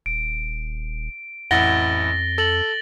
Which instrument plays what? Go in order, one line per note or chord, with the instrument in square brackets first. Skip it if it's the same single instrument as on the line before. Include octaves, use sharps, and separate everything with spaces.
[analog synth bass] D#1 [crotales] D7
[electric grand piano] A1 E4 F#5 [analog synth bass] F2 [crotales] A6 A#6 G7
[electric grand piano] A4 [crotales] A6 F#7